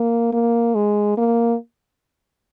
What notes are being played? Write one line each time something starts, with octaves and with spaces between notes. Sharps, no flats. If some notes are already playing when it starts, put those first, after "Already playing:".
Already playing: A#3
A#3
G#3
A#3